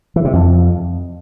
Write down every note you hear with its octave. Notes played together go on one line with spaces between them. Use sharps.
E3
C3
F2